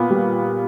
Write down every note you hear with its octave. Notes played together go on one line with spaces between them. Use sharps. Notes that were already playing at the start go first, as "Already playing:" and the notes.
Already playing: A#2 B3
G3